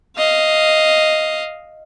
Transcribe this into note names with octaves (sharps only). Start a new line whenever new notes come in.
D#5 F5